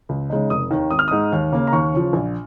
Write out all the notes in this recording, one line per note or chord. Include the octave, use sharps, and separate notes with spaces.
C#2
C#3 G#3 D#4
F1 D#6
D#2 D#3
G#1 D#6
F6
G#2 G#3 D#4 D#6
D#2
C#3 A#3
A#5
D#2 C#6
C#3 F3
A#1